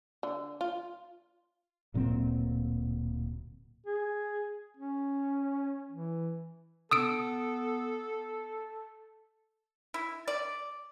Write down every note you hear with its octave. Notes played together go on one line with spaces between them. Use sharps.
D3
F4
D1 A#2 F#3 C4
G#4
C#4
E3
B3 A4 D#6 E6 D7
E4
D5